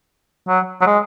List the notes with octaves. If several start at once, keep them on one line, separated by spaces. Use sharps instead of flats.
F#3
F#3
G#3